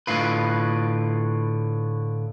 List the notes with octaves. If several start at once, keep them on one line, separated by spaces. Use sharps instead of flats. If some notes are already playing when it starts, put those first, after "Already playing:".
A2 D3 F4 B4